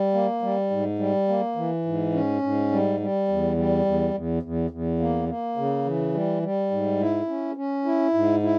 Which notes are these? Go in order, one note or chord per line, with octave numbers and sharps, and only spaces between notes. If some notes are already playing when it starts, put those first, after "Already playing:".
Already playing: G3
A#3
G3
G#2
G3
A#3
E3
G#2
C#4
G#2
G3
G3
E2
G3
E2
E2
E2
E2
A#3
A#3
C#3
E3
G3
G3
G#2
E4
C#4
C#4
E4
G#2
E4